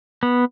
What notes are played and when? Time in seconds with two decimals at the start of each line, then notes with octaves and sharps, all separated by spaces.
0.23 B3